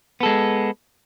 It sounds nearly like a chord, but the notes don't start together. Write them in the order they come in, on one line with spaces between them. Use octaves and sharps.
B3 A4 G#3